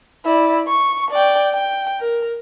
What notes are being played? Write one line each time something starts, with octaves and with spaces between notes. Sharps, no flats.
E4 D5
C#6
D5 G5
G5
A#4